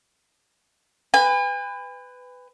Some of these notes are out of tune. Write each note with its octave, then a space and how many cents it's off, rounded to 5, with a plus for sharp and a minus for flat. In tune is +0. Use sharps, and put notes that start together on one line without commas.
B4 +20 G#5 -45